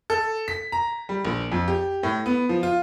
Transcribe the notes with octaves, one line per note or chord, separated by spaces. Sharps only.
A4
B6
A#5
G3
A#1
F2
G4
A2
B3
F3
F4